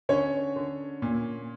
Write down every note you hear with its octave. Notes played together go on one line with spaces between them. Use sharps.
D3 C#4 C#5
D3
A#2